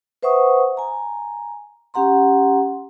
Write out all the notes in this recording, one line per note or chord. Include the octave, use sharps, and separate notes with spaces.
B4 C5 E5 F#5 C#6 D#6
G#5 A#5
C#4 G4 F#5 A#5 C6